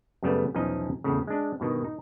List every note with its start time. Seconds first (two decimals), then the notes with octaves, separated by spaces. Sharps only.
0.23 F#2 C#3 G3 A3 B3
0.54 B1 E2 F3 C#4 D#4 D#5
1.04 E2 A2 C#3
1.27 G#3 D4
1.60 G2 B2 D#3
1.84 D#4